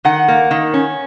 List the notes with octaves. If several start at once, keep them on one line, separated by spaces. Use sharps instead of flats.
D#3 F#5
A#3
D#3
C#4